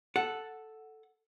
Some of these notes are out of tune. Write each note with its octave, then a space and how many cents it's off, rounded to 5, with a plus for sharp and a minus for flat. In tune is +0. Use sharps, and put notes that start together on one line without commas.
A4 +0 F#5 +0